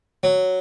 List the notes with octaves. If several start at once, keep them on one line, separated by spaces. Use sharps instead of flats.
F#3